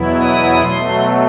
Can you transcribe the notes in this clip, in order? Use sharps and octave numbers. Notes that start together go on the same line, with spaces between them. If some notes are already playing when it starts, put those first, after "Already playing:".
Already playing: E2 B2 F#3 B3 E4
D#6
B2 F#3 A3 C6